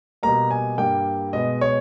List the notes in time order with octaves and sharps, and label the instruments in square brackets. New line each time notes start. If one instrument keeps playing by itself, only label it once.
[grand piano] B2 G3 A#3 A#5
G#5
G2 G3 A#3 G5
B2 G#3 B3 D#5
C#5